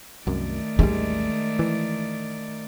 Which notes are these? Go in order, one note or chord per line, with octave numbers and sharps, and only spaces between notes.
C2 F#2 D#3 A3 D5
A1 D#2 G3 G#3
E3